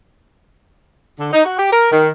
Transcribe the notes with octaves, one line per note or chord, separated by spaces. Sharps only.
D3
D#4
F#4
G4
A#4
D#3